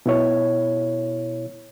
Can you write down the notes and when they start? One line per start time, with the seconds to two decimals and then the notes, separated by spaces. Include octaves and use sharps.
0.06 B2 E4 C#5